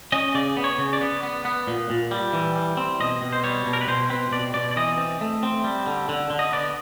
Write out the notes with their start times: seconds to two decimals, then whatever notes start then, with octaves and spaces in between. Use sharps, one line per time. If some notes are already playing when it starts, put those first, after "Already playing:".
0.12 C#4 D#5
0.34 C#3 D5
0.57 B3
0.64 C#5
0.78 C#3
0.93 D5
1.01 B3
1.23 B3
1.45 B3
1.67 A#2
1.90 A#2
2.11 G3
2.33 E3
2.56 G3
2.77 C4
3.00 B2 D#5
3.22 B2
3.33 C5
3.43 G3 C#5
3.66 B2
3.73 A#4
3.81 B4
3.88 B2 C5
4.10 C4 B4
4.31 B2 D5
4.54 B2 D5
4.71 D5
4.76 E3 D#5
4.98 C4
5.21 A3
5.43 C4
5.64 G3
5.87 D3
6.09 D3
6.30 D3
6.39 D#5
6.53 B3 D5